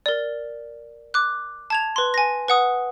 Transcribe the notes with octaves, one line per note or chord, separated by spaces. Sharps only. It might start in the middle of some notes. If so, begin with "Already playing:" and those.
A#4 D5
D6 F#6
A5 G#6 F7
B4 C6
G#5 A#6
B4 F#5 D#6